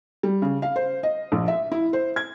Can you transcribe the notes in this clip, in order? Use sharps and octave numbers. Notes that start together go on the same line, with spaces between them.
G3
C#3
F5
C5
D#5
A#1
E5
E4
C5
G#6